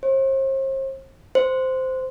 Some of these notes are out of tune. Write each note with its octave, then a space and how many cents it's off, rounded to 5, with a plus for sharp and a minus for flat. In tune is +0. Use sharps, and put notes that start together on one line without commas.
C5 +40
C5 -10